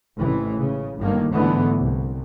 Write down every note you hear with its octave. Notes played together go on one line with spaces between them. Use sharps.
A1 G#2 C3 E3
C#3
G1 G2 D#3 A#3
G1 G#2 D3 E3 A3 B3
C2